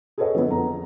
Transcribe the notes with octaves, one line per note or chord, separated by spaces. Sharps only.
G#4 A4 B4 C#5 D#5 F#5
D3 F3 B3
F2 A#5